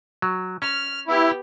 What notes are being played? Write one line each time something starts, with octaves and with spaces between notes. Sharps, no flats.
F#3
C#4 F6
B3 E4 G4